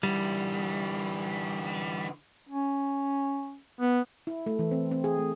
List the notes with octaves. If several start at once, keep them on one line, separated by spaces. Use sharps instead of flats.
D3 E3 G3
C#4
B3
E4
A3
E3
C4
C4
G#4
A3